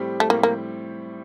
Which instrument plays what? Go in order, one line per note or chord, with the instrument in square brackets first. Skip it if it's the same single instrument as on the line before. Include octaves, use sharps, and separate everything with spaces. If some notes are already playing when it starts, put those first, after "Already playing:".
Already playing: [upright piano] A2 G3 C4 G4
[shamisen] A3
[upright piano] A2 G3 C4 G4 [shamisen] A#3
[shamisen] A#3